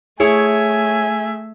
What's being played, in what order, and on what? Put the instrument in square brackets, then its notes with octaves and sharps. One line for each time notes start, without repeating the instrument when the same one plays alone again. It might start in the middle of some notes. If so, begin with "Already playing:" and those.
[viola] A3 E5 [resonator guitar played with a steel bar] E4 C#5 [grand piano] G#4 [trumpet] G#5